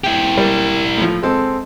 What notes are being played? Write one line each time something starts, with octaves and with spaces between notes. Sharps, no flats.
E4 G4
G3 A#3
A2 F3
G#3 C4 A4